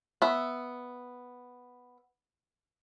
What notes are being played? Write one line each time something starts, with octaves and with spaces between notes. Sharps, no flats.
B3 E5